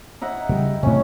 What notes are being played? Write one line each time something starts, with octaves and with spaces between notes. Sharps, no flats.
D#4 E4 F#5
C#3 G3 G5
A2 C3 C#4